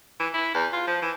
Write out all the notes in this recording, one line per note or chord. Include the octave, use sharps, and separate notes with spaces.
E3
E4
E2
F4
F3
E3